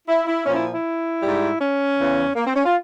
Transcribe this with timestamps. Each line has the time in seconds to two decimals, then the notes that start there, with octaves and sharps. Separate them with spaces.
0.08 E4
0.27 E4
0.45 A#2 F3 C#4
0.55 E4
0.74 E4
1.21 G3
1.26 G#2
1.60 C#4
1.98 E2 C#3 E3
2.35 A#3
2.46 C4
2.55 C#4
2.65 F4